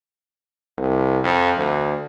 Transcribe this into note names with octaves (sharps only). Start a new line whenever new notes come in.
C2
F2
D2